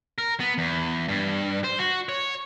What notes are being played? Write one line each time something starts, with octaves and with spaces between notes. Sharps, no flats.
A#4
B3
E2
G2
C5
F#4
C#5